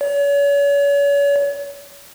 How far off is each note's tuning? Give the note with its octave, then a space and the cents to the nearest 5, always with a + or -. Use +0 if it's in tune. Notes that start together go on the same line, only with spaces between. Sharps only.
C#5 +40